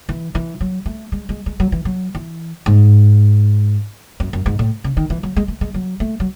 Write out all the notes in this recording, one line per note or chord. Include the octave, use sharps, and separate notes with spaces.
E3
E3
F#3
A3
G#3
G#3
G#3
F#3
E3
F#3
E3
G#2
F#2
F#2
G#2
A2
C#3
D#3
E3
F#3
G#3
A3
G#3
F#3
A3
F#3